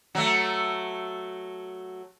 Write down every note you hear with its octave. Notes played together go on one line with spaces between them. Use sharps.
F#3 A3